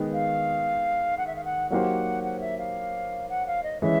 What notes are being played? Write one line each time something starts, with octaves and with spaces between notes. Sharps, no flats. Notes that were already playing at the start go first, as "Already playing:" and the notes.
Already playing: D#3 G#3 B3
F5
F#5
E5
F5
F#5
F#3 A#3 D#4 G4 C5 F#5
F#5
E5
F5
F#5
F5
D#5
E3 G#3 C#4 E5